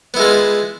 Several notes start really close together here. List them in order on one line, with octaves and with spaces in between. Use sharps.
B3 E4 G#3 F4